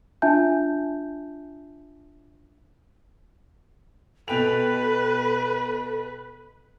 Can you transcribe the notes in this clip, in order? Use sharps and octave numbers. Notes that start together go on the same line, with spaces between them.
D4 F4 E5 G#5 A5 G6
B2 A4 B4 G5 F7